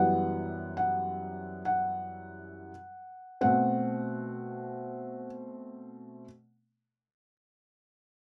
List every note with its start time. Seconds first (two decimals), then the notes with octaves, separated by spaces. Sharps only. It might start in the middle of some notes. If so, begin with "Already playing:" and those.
Already playing: F#2 E3 G3 B3 F#5
0.77 F#5
1.65 F#5
3.41 B2 A3 C4 F#5